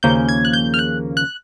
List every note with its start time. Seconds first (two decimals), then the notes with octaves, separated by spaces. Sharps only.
0.03 D#2 C#3 F3 A#3 C#4 G6
0.29 G#6
0.45 F#6
0.53 G6
0.74 F6
0.79 F#6
1.17 F#6